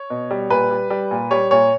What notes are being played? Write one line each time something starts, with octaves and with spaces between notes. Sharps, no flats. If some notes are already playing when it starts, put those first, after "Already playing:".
Already playing: C#5
B2
G3
A#2 B4
G3
G3
A#2
G3 C#5
A#2 C#5